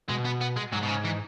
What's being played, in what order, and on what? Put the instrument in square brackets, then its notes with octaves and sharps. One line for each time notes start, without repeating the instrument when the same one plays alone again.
[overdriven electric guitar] B2 [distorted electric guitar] G#3
[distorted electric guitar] B3
B3
G#3
[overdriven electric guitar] G#2 [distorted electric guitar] F#3
[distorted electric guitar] B2
C#3
E3